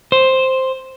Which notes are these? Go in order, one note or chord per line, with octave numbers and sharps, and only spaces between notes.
C5